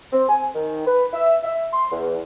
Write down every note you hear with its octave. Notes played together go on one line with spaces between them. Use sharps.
C4
G#5
D#3
B4
E5
E5
C6
E2